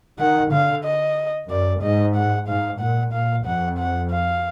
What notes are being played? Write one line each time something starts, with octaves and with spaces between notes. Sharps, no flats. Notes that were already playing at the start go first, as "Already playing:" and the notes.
D#3 F#5
D3 F5
D#5
F#2 D5
G#2 D#5
F#5
G#2 F5
A#2 F#5
A#2 F5
F2 F#5
F#5
F5